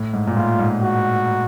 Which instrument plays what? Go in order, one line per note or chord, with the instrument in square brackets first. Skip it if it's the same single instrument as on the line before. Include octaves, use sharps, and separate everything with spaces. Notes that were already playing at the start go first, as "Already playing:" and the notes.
Already playing: [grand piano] A2
G#2
A#2
[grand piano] A2 [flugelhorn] F4
[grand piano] G#2
[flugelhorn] F#4